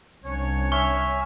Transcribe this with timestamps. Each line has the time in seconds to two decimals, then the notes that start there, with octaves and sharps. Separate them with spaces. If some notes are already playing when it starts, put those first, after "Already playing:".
0.24 C2 C#4 D4 C#5
0.72 E5 G#5 C#6 F6